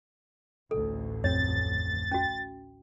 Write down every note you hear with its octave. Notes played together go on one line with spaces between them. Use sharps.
A1 D2 A4
F2 C4 C#5 A6
C#4 F#4